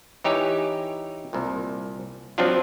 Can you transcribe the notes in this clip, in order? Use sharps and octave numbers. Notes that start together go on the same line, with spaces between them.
E3 D#4 G4 C#5 G#5
C2 A#2
F3 F#3 C4 D4 F4